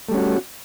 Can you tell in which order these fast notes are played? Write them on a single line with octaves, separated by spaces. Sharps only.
A3 G3 C#4 F#4